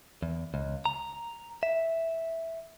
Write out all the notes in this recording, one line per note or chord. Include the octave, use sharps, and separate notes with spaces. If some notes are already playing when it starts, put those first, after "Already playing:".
E2
C#2
A#5
E5